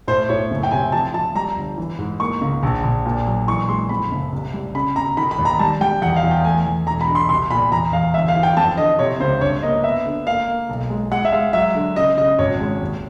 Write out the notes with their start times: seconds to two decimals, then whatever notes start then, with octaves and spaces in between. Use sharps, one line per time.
0.08 A2 C5
0.29 A2 C#5
0.50 F#1
0.63 G5
0.71 C3 G#5
0.92 F3 A5
1.14 F3 A5
1.35 G3 A#5
1.56 G1
1.78 E3
1.98 G#2
2.20 A#3 C#6
2.41 C#2
2.63 A#1
2.83 A#1
3.06 A#2
3.27 F#3
3.48 E3 C#6
3.69 G#3 C6
3.89 F2 B5
4.11 F#1
4.33 C2
4.53 G3
4.75 C#3 B5
4.96 F1 A#5
5.17 D#3 B5
5.31 B5
5.38 D#2
5.45 A#5
5.59 G3 A5
5.81 G3 G5
6.02 E2 F#5
6.16 F5
6.23 E2
6.31 G5
6.44 A3 G#5
6.66 E2
6.87 E1 A#5
7.01 B5
7.08 D3
7.15 C6
7.29 C2 C6
7.51 A#2 B5
7.72 E2 A#5
7.93 E2 F5
8.14 G1 E5
8.28 F5
8.36 E3
8.43 G5
8.57 F2 A5
8.77 D3 D#5
8.99 C3 C#5
9.20 C#2 C5
9.41 G2 C#5
9.63 A#3 D#5
9.83 B3 E5
10.05 D3
10.26 A#3 F5
10.48 A#3
10.69 B1
10.90 G#3
11.11 G#3 F#5
11.25 E5
11.32 G#3 F5
11.53 F#3 E5
11.75 D3
11.96 C#3 D#5
12.17 C#3 D#5
12.39 G#1 C#5
12.60 G#3
12.81 D#2